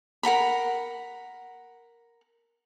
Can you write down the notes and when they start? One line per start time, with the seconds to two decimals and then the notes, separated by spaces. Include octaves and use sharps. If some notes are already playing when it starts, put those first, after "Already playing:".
0.23 A#4 F#5 A#5 B5